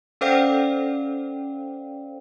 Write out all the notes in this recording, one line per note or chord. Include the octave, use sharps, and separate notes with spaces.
C#4 A4 C5 D5 F5 G5